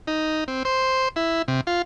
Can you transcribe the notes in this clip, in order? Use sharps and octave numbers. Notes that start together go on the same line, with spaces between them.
D#4
C4
C5
E4
C3
F4